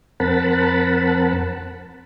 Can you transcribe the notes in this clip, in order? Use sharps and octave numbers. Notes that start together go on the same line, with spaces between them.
F2 C4 A#4 F#5 A5 B5